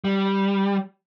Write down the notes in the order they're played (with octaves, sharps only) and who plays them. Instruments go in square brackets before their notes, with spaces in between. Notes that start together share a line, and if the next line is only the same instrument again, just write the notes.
[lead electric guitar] G3